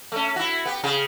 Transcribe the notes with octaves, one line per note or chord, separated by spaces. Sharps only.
A3 C#4
E4 F#4
B3 G4
C#3 G#4